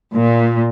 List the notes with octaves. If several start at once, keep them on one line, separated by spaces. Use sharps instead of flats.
A#2